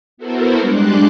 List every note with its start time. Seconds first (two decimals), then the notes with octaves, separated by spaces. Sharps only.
0.17 B3 E4 F#4 A4 A#4 C5
0.60 G3 G#3 D4 C6 D6 F#6